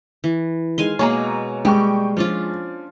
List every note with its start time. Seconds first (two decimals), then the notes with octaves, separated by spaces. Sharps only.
0.24 E3
0.78 D#3 G#3 F5 G#5 C6
0.99 B2 G#3 A#3 C#5 G#5 A#5
1.65 G3 G#3 G5 C#6
2.17 F3 C#4 D4 F4